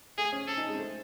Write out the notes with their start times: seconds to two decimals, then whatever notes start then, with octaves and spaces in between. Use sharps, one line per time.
0.18 A3 G#4
0.32 C#4
0.47 C#4 A4
0.57 D#4
0.68 G#3
0.74 C4
0.78 A3